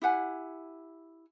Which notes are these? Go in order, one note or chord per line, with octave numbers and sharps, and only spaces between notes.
E4 G4 F#5 G#5